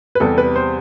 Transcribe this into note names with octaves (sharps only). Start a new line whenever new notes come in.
B4
E2 C3 G3 A4
B4
C5